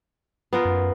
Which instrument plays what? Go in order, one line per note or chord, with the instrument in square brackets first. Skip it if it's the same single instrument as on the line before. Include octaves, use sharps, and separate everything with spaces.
[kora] B3 F4 A#4
[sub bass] F#2